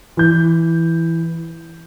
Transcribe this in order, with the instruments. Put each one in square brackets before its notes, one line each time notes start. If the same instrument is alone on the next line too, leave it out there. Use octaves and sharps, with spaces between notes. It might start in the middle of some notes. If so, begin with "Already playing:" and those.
[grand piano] E3 G6